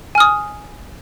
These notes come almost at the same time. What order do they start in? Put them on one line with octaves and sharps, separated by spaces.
G#5 F6 D#6